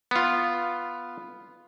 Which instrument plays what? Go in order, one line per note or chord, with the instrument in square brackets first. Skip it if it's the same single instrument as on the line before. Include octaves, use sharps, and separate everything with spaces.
[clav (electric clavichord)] B3 F4